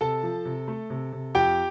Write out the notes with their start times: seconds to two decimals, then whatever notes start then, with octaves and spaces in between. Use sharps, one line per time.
0.01 C3 A4 A5
0.23 F3
0.45 C3
0.68 A3
0.90 C3
1.13 C3
1.35 F2 G4 G5